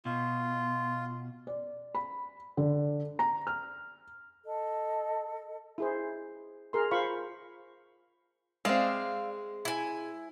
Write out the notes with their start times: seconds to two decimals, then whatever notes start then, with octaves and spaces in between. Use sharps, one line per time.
0.05 B2 F4
1.47 D5
1.95 B5
2.57 D3
3.19 A#5
3.47 F6
4.45 A4 D#5
5.78 E4 G#4 C5
6.73 G#4 A#4 C6
6.91 F4 C5 F5 B5 C#6
8.65 G#3 C4 D5 E5 F5
9.65 E4 G#5